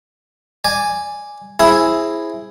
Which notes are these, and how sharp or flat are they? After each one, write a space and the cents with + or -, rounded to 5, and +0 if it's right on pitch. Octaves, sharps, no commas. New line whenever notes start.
D5 +0 G#5 -5
C4 +15 E4 +0 G#4 +0